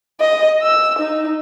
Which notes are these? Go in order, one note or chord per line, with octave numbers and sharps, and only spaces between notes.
D#5
E6
D#4